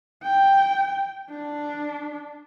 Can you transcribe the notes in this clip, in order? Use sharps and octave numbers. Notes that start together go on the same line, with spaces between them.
G5
D4